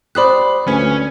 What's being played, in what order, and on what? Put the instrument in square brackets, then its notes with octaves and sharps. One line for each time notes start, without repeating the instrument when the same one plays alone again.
[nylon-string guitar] G4 C5 D5 [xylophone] B5 D#6 F#6
[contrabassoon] D2 [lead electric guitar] C#4 [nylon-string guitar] B4 C#5 G#5